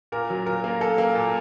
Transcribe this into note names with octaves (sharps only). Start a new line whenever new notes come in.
A#2 A#4
F#3
A#2 A#4
A#3
A#3 A4
A#3
A#2